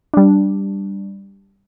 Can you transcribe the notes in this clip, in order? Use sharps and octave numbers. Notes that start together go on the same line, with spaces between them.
G3 D4